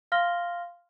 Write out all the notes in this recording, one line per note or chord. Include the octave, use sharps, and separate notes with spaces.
F5 C6 F6 A#6 G7